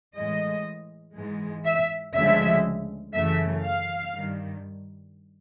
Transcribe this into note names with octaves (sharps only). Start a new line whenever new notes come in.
A2 E3 G#3 D#5
G#2 E3 G#3
E5
D2 C#3 F3 G#3 E5
F#2 C#3 E3 A3 E5
F5
G2 D#3 G3